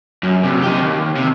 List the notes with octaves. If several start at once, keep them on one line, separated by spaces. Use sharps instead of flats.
F#2
G2 C3
D#4 G4
D#2
C3